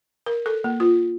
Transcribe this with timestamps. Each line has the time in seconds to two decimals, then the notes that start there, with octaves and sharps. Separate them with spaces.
0.26 A#4
0.46 A4
0.64 A#3
0.80 F4